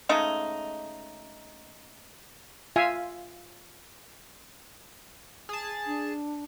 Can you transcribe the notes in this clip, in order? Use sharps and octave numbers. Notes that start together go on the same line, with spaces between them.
C#3 G#3 A3 D#4
F4 E5 F5 G#5
G#4 A5
D4